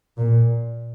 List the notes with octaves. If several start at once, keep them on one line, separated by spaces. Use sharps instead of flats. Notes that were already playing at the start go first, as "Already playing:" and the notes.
A#2